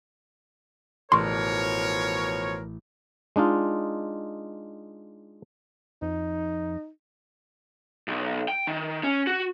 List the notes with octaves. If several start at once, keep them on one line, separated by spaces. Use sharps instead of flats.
A1 B2 F3 A#4 C#5 C6 C#6
G#3 D4 D#4 F4
F2 D#4
B1
G5
D#3
C#4
F#4